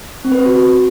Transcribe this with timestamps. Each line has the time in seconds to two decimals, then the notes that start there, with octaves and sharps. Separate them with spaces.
0.25 C4
0.32 B4
0.39 C4
0.46 F#4